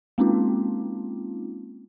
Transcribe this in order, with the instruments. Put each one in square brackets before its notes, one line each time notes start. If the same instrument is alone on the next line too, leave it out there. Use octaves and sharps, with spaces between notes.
[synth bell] G#3 A#3 C4 C#4 D#4 F4